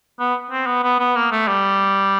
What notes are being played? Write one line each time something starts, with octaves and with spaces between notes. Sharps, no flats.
B3
C4
B3
B3
B3
A#3
A3
G3